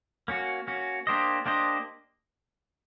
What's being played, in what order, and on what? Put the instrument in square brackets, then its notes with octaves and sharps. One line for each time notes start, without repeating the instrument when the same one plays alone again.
[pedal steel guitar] A#3 C#4 F#4
A#3 C#4 F#4
A#3 D4 G4 C5 D#5
A#3 D4 G4 C5 D#5